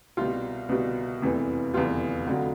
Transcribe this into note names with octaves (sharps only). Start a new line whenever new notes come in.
C2 B2 G3 F4
C2 B2 G3
F1 E2 C3 E3 G3
F1 E2 C3 E3 G3 F4
F1 F2 D3 F#3